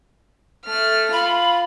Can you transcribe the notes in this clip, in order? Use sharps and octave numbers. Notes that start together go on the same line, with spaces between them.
A3 F6
F4 B5